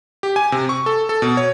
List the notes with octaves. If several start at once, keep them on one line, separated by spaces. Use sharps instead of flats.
G4
G#5
C3
C#6
A4
A4
B2
C#5